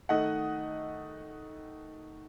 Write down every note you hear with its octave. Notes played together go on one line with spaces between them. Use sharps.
D#3 A3 D#5 F#5